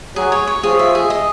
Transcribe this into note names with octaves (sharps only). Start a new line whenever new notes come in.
F#3 G#4
C#5
C#5
F3 G#4
E5
G#4
D#5